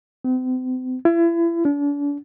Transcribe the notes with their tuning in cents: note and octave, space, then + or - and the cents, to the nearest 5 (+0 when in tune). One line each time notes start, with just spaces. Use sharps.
C4 -40
E4 +35
D4 -40